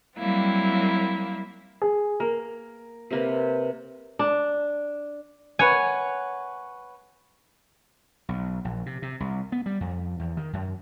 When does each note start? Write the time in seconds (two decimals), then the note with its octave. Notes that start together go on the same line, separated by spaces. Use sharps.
0.18 F#3 G3 A#3 C4 E4 F5
1.82 G#4
2.20 A#3 A#4
3.10 C3 A#3 B4
4.19 D4
5.59 B4 C#5 F#5 G#5
8.29 B1
8.65 A#1
8.86 C3
9.02 C3
9.20 C2
9.52 B3
9.66 G3
9.80 F2
10.19 E2
10.37 D#3
10.53 F#2